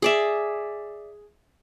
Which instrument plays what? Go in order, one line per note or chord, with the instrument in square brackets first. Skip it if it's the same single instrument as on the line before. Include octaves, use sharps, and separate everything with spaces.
[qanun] G#4 D5 E5